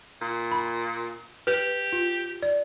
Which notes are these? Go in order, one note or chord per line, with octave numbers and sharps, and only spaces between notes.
A#2
B5
G4 B4
F4
D5